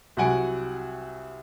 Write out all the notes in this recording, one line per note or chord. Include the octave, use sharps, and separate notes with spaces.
C2 F#3 F#5 G#5 D7